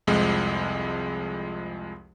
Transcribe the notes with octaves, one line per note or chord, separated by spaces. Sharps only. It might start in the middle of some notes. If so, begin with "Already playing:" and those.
C2 F2 F3 G#3